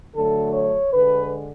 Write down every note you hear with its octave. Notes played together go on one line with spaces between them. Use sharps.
D3 F#3 A3 A4
C#5
D3 G#3 B4